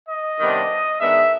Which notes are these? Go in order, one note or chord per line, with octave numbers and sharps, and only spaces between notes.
D#5
C3 D#3 G3 B3 D4
D#3 G#3 B3 D4 E5